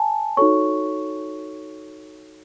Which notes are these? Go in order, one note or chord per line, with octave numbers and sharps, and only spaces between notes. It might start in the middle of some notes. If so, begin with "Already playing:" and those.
Already playing: G#5 A5
D#4 F#4 A4 C#5 C#6